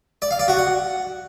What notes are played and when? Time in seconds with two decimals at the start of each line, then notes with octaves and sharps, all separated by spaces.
0.22 D5
0.31 F5
0.39 D5
0.48 F#4
0.57 F#5